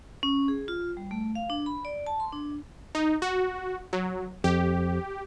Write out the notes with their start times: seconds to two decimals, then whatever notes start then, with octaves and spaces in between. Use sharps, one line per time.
0.23 C#4
0.48 G#4
0.68 F4
0.97 G3
1.11 A3
1.35 F5
1.50 D4
1.66 B5
1.85 D5
2.07 A5
2.20 C6
2.32 D4
2.95 D#4
3.22 F#4
3.93 F#3
4.44 F2 G4